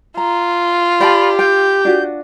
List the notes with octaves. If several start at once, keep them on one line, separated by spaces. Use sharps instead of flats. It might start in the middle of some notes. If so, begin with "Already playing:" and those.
F4 A#5
G4 D5 G5 A5 B5
G5 G6
D4 F4 F#4